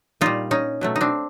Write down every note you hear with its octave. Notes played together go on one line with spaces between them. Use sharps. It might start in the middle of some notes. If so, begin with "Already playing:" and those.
A#2 G3 D#4 F4
C#4 D#4
B2 F#3 A3
D#4
C4 D4